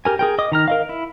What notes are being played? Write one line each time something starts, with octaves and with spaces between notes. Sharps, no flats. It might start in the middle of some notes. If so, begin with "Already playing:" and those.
G4 A#4 G#5
G#4 A#4 G5
D#5 D6 D#6
D#3 A#5 F6
A#4 D#5 F5
E4